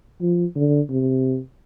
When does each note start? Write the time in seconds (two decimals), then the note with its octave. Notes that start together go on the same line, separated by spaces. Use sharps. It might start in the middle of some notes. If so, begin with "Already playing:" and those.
0.21 F3
0.56 D3
0.90 C3